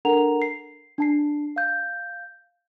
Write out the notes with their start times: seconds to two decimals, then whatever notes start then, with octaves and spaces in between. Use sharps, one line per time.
0.05 D4 A4 A#4 F#5 A#5 F7
0.42 C7
0.98 D4 A5 C7
1.56 F5 G6